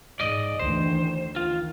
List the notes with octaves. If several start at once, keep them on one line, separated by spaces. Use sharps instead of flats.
G#2 D5 D#5
D2 D#3 E3 C5
D#3 F4